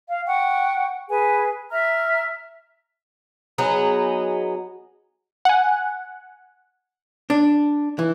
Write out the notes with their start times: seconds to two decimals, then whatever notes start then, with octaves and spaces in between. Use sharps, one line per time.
0.09 F5
0.27 F#5 G5 C#6
1.09 G#4 B4 G#5
1.71 E5 A#5 F6
3.58 F#3 B3 D#4 G#4
5.45 F#5 G#5
7.30 D4
7.99 E3